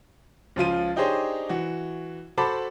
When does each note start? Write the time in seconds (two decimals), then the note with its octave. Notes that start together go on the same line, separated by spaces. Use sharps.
0.56 C#2 F3 F4 D#7
0.96 D4 D#4 G4 G#4 C5 C#5
1.49 E3 F#4
2.37 F#4 A4 C5 A5 B5 D6